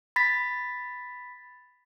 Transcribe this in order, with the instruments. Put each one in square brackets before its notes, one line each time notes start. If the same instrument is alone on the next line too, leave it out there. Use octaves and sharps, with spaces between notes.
[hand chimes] B5 A6 B6